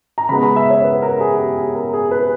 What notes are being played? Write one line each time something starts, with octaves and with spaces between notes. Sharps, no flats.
A#5
C#3 G#3 B3 B5
B5
E5
C#5
B4
A#4
G#4
G4
G#4
A#4
G#4
B4